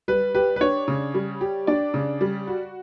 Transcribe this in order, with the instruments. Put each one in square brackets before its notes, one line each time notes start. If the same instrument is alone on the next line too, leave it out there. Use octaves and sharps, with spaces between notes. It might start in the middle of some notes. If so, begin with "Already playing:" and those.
[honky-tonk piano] G3 [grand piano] B4
[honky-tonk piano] G4 [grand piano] B4
[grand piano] B4
[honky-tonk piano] D4 [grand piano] C#5
[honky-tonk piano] C#3
G3
G4
[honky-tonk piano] D4 [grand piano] D5
[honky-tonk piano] C#3
G3
F#4